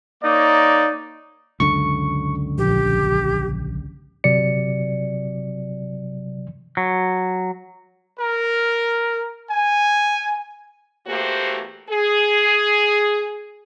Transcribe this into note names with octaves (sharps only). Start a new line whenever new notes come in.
A#3 D#4 C#5 D5
C#2 F#2 D3 C#6
A#1 G4
G1 C3 F#3 D5 C#7
F#3
A#4
G#5
E2 A3 A#3 F#4 G4 C5
G#4